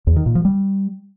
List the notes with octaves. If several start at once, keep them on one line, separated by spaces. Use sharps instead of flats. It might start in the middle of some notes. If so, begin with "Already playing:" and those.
E2
D#3
A#2
F3
G3